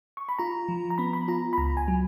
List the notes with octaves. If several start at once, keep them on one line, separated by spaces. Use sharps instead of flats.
C#6
B5
F4 A#5
F3
A#5
B3 B5
B5
F4 A#5
B5
C#2 A#5
G#5
F#3